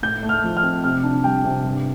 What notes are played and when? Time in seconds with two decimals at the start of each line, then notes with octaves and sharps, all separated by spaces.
0.03 A2 G6
0.23 A3
0.29 F6
0.44 F3
0.57 F6
0.63 C4
0.84 C3 F6
1.03 D4
1.24 G3 G5
1.44 C3
1.64 G2